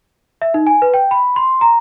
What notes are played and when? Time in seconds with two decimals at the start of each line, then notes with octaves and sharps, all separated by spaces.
0.42 E5
0.54 D#4
0.67 G#5
0.82 B4
0.94 G5
1.11 B5
1.36 C6
1.61 A#5